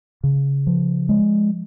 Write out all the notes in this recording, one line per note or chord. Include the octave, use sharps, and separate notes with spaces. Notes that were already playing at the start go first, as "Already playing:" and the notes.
C#3
F3
G#3